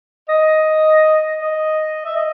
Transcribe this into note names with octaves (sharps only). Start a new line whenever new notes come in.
D#5
D#5
E5
D#5